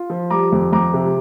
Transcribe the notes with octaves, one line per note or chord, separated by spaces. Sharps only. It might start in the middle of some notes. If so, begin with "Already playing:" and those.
Already playing: F4
F3
G3 A#5 D6
F2
F2 A#5 D6
C3